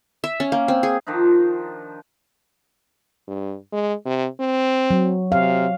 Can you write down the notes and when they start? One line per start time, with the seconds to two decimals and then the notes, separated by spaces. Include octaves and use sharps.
0.24 E5
0.40 C#4
0.52 A#3
0.68 C4
0.83 G#4
1.07 D#3 F3 D4 D#4
3.28 G2
3.73 G#3
4.06 C3
4.40 C4
4.90 F#3
5.32 C3 F5